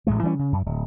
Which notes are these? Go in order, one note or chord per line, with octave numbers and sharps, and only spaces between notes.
A1 A2 G#3 A3
E3 G3 C4 C#4
C#3
F#2
D1